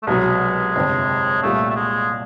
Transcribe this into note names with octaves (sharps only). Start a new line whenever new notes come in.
A3
C2 B2 F#3 G#3 B3
G1 F2 C3
C2 A#2 G3 A3
A3
G#3